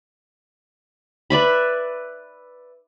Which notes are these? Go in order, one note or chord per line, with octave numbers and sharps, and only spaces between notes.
B4 D5 E5 B5